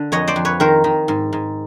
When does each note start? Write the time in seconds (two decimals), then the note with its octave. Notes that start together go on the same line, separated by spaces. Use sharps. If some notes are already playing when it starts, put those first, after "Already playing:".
Already playing: D3
0.12 F2 C#5 D#5
0.28 C5 D5
0.36 F2
0.45 B4 C#5
0.60 D#3 A#4 C5
0.84 D#3
1.08 G#2
1.33 G#2